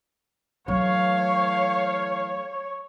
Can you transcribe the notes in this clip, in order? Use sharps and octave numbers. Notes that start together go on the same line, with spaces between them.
E3 F#3 A3 A4 C#5 F5